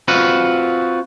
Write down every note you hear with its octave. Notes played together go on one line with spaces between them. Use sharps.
C4 F4 F#4 B4